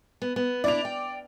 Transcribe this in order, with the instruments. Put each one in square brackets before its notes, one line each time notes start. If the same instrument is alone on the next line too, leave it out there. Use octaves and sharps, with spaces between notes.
[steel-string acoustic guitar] B3
B3
[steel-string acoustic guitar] D4 E4 [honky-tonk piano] D5 F7
[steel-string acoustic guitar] G5